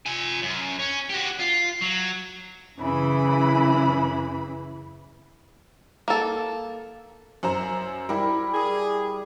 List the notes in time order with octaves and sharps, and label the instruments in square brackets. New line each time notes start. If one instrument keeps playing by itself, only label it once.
[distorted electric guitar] F4 G#5
F#2
C#4
F#4 G4
F4
F#3
[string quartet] F#2 C#3 E3 E4 B5
[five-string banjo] A#3 A4
[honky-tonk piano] F#2 C5 A#5
[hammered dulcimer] G3 [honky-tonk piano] E4 A#4
[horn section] G#4